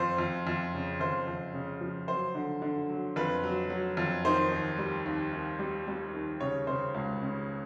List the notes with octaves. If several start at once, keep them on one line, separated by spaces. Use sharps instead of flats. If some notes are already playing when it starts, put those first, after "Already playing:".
Already playing: F2 C5
F2
F2
C#3
F2 C5
F2
C#3
F3
F#3 C5
D3
D3
F#3
F2 B4
F#3
F#3
F2
D#3 C5
D#2
G3
D#2
D#2
G3
G3
D#2
C#3 C#5
C#3 C5
C#2
C#3